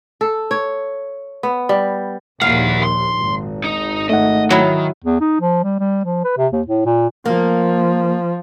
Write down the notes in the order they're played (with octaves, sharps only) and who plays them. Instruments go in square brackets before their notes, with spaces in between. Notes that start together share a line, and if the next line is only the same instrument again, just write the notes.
[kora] A4
C#5
B3
G3
[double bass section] A#1 D#2 A#2 [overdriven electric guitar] E4 F#5 [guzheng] F5
[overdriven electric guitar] C6
[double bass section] G#1
[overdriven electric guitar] D#4
[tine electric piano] A3 D#4 F#5 [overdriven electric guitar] D#5
[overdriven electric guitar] D#3 [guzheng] F#3 E4
[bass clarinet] E2
D#4
F3
G3
G3
F3
B4
C3
D#2
A2
A#2
[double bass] F3 [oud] A#3